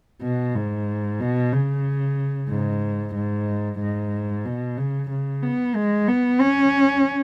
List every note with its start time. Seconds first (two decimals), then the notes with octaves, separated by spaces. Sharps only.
0.22 B2
0.56 G#2
1.21 B2
1.53 C#3
2.50 G#2
3.15 G#2
3.80 G#2
4.45 B2
4.78 C#3
5.10 C#3
5.43 B3
5.75 G#3
6.08 B3
6.40 C#4